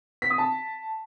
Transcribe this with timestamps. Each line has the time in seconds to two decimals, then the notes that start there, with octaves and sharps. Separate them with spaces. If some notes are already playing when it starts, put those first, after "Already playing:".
0.22 B6
0.30 D#6
0.38 A5